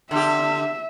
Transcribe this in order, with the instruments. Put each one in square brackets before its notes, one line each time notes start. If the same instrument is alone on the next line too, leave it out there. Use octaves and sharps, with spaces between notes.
[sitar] D3 G4 [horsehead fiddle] E5